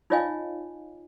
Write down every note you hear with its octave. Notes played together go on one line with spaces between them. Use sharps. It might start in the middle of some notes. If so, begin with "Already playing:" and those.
D#4 F4 C#5 D#5 F5 G#5